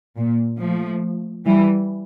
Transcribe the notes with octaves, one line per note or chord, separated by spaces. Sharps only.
A#2
F3 A3
E3 G3